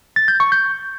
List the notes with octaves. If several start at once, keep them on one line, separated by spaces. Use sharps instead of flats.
A6
G6
C#6
G6